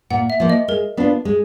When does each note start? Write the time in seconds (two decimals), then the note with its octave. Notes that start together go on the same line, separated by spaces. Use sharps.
0.10 A#2 F#5
0.30 E5
0.40 F3 A#3
0.50 D#5
0.68 G#3 A#4
0.97 B3 D4 F4
1.25 G#3